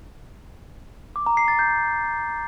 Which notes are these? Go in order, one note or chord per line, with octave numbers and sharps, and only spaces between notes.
D6
A#5
C7
A6
G6